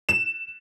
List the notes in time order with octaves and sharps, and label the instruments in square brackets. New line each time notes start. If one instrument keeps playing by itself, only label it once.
[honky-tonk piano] E7